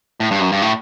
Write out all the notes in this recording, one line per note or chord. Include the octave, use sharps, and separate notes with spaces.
A2
G2
F#2
G2
A2